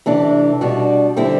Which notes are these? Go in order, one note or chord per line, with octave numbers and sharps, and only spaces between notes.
C3 E3 A3 D4
B2 G3 D4 F#4
D3 G3 C4 E4